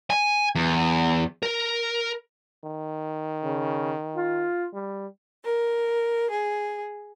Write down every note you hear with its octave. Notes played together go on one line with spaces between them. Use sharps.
G#5
E2
A#4
D#3
C#3
F4
G3
A#4
G#4